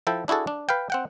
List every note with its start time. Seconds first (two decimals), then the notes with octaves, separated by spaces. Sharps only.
0.07 F3 E4 A4 G5
0.28 D4 E4 F#4 G#4 A4
0.47 D4
0.69 B4 F5 G5
0.90 C4 F#5 G5